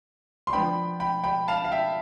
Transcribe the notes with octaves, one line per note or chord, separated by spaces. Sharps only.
C6
F3 B3 D4 G5 B5
G5 B5
G5 B5
F5 A5
F5
E5 G5